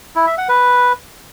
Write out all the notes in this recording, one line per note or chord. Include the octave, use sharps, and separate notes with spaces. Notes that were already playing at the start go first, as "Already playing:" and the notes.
E4
E5
F#5
B4